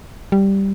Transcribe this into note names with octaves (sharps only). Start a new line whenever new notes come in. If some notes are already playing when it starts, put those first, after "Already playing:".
G3